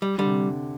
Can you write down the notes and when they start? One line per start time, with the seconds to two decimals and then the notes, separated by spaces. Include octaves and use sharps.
0.02 G3
0.18 D3 G3
0.26 C3